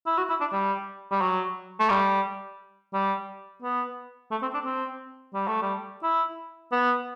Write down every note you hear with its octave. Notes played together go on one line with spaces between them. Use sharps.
E4
F#4
E4
D4
G3
G3
F#3
A3
G3
G3
B3
A3
C4
D4
C4
G3
A3
G3
E4
B3